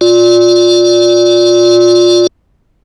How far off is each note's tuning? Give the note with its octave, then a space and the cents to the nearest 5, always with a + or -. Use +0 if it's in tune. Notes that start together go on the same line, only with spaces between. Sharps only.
F4 +20 D5 +0